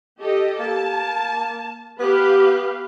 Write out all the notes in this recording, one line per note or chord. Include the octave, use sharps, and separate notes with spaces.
G4 A4 D#5
A#3 A5
B3 G4 B4 F5